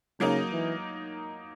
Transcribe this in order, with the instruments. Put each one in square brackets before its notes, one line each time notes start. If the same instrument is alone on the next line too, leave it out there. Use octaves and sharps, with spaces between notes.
[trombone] C#3 [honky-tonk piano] F#3 A#3 D#4 A#4
[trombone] E3